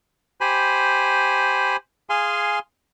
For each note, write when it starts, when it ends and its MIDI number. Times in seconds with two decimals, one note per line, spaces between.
0.41 1.76 67
0.41 1.76 72
0.41 1.76 80
0.41 1.76 83
2.10 2.59 68
2.10 2.59 77
2.10 2.59 80
2.10 2.59 84